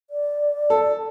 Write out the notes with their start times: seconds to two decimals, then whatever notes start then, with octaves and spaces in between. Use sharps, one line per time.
0.10 D5
0.70 A4